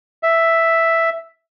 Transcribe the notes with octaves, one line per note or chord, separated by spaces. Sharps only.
E5